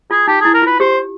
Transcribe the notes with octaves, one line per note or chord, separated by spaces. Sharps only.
F4 G#4
D#4 G4
G#4
E4
A#4
F4 B4
G4 C5